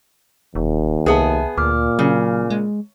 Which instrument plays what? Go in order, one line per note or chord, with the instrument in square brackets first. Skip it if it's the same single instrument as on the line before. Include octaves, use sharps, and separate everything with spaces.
[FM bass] E1 [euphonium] D#2
[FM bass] C2 [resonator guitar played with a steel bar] B3 G#4 [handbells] B4 E5 A5
[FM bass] D2 [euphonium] A#2 [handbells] D6 F6
[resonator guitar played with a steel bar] C#3 [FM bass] F#3
[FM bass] G#3